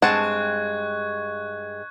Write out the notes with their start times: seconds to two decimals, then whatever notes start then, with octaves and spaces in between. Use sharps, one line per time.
0.02 G2 G#3 C4 F#5 A5 C#6 F#6 G#6